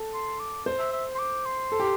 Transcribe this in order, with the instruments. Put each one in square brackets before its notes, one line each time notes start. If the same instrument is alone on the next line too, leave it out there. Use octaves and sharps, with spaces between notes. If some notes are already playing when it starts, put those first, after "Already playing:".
Already playing: [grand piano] A4
[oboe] C6
D6
[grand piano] C5
[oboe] E5
E5
C6
D6
C6
[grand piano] A4
G4